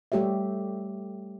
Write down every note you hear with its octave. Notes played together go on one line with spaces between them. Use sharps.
G3 A3 G4 C#5 E5